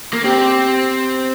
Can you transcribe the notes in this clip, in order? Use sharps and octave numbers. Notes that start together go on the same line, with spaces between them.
A#3
C4 G4